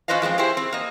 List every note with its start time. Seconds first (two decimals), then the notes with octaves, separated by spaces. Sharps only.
0.08 C#4 F4 B4 C5 D#5 F5
0.22 F3 G#3 B3 C4
0.38 E4 G4 G#4 C5
0.57 C4
0.72 A#3 D#5